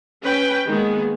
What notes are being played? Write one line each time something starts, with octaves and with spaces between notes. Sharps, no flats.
C#4 B4 G5
D#3 G#3 A#3 B3 G#4